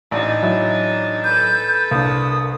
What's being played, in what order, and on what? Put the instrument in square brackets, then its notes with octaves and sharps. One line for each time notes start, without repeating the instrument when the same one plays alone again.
[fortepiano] A1 D5 [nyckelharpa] D4 D#4
[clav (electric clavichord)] F#3 E4
[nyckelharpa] A4 B4 [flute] G6
[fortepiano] C2 [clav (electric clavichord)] A#3 D4 [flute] D#6